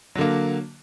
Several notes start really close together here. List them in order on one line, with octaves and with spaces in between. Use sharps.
F#3 D3 A#3